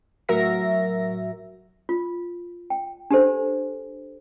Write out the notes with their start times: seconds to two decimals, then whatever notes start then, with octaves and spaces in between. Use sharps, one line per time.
0.29 A2 F#3 F#4 A#4 E5 A#6
1.89 F4
2.70 G5
3.11 D4 G4 A4 C5